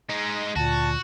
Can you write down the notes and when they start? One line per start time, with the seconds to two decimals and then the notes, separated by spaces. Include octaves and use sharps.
0.09 G#3 D#4
0.56 D2 A#2 F#4 A5